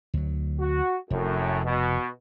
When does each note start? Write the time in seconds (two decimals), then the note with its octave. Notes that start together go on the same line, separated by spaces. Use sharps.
0.14 D2 F#3
0.60 F#4
1.11 F1 F#2 A2
1.65 B2